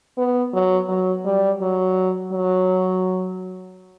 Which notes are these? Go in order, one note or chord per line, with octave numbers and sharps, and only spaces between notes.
B3
F#3
F#3
G3
F#3
F#3